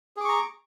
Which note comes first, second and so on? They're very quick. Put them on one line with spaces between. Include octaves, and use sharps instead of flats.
G#4 D6 C#6 A#5